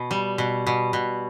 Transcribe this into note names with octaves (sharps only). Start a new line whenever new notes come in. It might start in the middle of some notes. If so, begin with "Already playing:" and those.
Already playing: B2
G3
B2
B2
B2